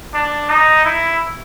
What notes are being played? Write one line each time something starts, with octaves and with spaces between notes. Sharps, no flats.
D4
D#4
E4